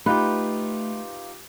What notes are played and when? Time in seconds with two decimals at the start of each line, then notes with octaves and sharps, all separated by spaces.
0.06 A3 D#4 F4 G4 B4